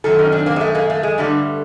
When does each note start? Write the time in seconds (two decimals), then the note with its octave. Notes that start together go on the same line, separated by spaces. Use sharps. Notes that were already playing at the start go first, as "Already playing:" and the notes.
0.04 F#2 D#3 F#3 A4
0.19 C#4 D#4
0.32 C4 D4
0.46 A#3 C4
0.56 G#3
0.61 A3
0.75 G#3 A#3
0.90 A3
1.03 G#3
1.18 G2 D3 G3 A3